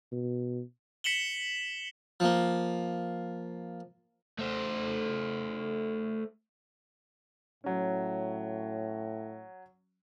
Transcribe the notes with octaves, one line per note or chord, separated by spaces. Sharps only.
B2
B6 C#7 E7 F#7 G7
F3 A#3
A3 C5
A2 F#3 C#4